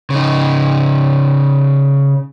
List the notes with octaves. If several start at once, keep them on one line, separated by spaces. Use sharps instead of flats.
C#3 D#4